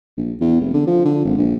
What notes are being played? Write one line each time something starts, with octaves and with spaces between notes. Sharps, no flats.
A#1
E2
F1
D3
F3
D3
G#1
A#1